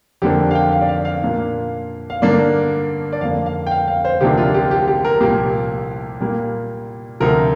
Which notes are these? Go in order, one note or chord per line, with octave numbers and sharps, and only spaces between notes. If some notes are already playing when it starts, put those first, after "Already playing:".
F2 D3 A#3 D4 G4
F5
G5
F5
D5
F5
F5
A#2 A#3 D4
F5
G2 D3 A#3 D4 D5
D5
F2 D3 A#3 F5
F5
G5
F5
F5
C5
D2 C3 F3 A#3 D4 G4
F4
G4
G4
G4
A#4
C2 A#2 F3 A#3 G4
A#2 G3 A#3
D2 C3 F3 A#4